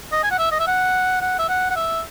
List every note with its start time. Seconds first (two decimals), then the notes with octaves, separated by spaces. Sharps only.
0.12 D#5
0.24 G#5
0.31 F#5
0.39 E5
0.52 D#5
0.60 E5
0.67 F#5
1.21 F#5
1.39 E5
1.49 F#5
1.71 F#5
1.76 E5